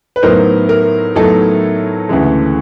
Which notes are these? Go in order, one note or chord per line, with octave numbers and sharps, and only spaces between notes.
B4
A2 F#3 B3 D#4 A#4 C5
A#4
A2 F#3 B3 D#4 A4
D2 C#3 E3 G#3